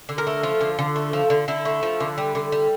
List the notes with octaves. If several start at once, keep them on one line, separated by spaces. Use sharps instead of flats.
D3
A#4
A3
F3 F4
D3
D3
A3
F3
D3
D3 E4
A3
F3
D3
G3
D3
G3